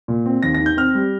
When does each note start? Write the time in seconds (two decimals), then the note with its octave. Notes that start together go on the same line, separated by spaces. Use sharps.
0.08 A#2
0.26 C4
0.43 D#2 A#6
0.54 A#6
0.60 D#3
0.66 G6
0.77 C4 F6
0.95 G3